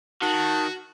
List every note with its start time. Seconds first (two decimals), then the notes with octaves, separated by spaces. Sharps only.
0.22 D#3 F#4 A5